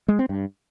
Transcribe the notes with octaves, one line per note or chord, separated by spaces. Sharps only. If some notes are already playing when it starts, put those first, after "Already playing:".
G#3
C4
G2